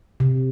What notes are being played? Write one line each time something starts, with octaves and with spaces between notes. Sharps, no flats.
C3